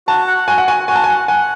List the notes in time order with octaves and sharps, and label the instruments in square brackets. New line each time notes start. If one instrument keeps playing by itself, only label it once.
[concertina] F#4 [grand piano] A5
[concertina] F#5
[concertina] F#4 [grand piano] G#5
[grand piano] F#5
[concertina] F#4 [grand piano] G#5
[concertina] F#4 [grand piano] G#5
[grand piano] A5
G#5
[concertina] F#5
[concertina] F#5 [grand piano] G#5